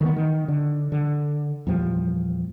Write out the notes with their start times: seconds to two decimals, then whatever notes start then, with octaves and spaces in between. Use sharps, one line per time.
0.01 D#3 E3 G3 B3
0.16 D#3
0.48 D3
0.92 D3
1.67 E2 A#2 F3 G3